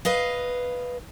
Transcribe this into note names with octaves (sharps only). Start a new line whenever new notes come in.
B4 D#5 F5